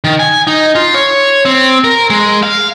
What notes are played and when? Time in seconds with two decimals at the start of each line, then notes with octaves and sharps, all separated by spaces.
0.04 D#3
0.19 G#5
0.47 D#4
0.75 F4
0.94 C#5
1.45 C4
1.84 A#4
2.10 G#3
2.43 F5